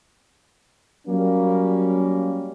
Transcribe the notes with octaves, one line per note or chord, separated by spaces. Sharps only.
F#3 G3 A#3 C#4